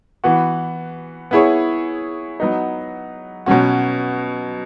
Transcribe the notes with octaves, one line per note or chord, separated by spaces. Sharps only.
E3 B3 F#4
B3 E4 G#4 C#5
F#3 B3 D#4
B2 F#3 C#4 F#4